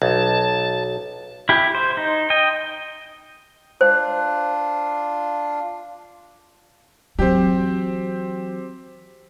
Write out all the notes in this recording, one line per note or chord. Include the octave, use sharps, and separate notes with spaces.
B1 A5
E4 G4
C5
D#4
D#5 G5
D4 F4 C5
E3 F#3 C4 G4